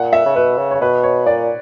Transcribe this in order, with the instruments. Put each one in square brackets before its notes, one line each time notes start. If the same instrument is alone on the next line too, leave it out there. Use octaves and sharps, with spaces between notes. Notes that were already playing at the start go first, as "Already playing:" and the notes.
Already playing: [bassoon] A#2 [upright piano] F#5
[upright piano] E5
[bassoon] C#3
[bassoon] B2 [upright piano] B4
[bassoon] C#3
[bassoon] C#3 [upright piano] C#5
[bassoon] B2 [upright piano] B4
[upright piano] C#5
[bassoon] A#2 [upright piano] D5